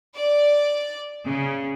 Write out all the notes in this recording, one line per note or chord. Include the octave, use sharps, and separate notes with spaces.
D5
C#3